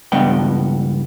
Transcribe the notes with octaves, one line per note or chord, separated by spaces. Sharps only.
C#2 G2 B3 G5